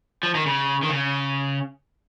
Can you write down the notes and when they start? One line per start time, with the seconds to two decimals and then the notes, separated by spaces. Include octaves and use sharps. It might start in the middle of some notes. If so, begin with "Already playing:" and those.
0.23 F3
0.35 D#3
0.46 C#3
0.83 D#3
0.89 C#3